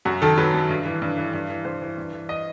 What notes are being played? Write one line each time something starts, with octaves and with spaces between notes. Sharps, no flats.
F#2 F#4
D#3 A4
F#3 B4
F#2
G2
E3
G2
E3
G2
E3
G2 C5
E3
G2
E3
D#5